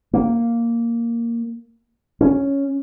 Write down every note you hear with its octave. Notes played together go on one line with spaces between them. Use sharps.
A#3
C#4